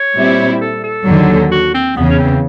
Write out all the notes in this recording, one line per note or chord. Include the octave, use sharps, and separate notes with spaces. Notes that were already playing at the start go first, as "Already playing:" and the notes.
Already playing: C#5
A#2 G3 C4 E4
A4
A4
D#2 D3 F#3
F#4
C4
E2 C#3 E3 B3
C#4
C4